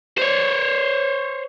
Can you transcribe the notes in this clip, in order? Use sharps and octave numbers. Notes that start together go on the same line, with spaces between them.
C5 C#5